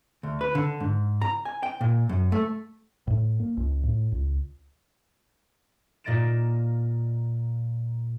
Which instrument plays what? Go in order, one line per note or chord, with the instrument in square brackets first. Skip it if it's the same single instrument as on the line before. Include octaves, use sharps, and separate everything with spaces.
[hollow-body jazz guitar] D2
B4
D3
G#2
A#5
G#5
G5
A#2
F#2
A3
[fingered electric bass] A2
A#3
C#2
A2
C#2
[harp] A#2 A#3 D#5 A6 D7 E7